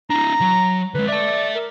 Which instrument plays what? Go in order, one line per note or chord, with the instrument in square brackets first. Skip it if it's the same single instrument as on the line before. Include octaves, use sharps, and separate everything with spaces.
[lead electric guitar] D4 E4 [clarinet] A#5
[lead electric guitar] F#3
[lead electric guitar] D3 G#3 [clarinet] B4
[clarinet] D5 [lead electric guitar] E5 A5
[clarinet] A#4